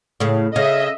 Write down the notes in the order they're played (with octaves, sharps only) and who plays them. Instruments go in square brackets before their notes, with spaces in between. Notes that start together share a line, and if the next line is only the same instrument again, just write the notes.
[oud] A2 C#3
[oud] C#3 [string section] D#5 E5